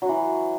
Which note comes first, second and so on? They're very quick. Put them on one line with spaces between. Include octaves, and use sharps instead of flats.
F#3 F#4 E3